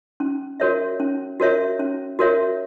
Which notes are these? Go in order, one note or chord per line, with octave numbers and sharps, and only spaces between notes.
C#4
F#4 A#4 C#5 E5
C#4
F#4 A#4 C#5 E5
C#4
F#4 A#4 C#5 E5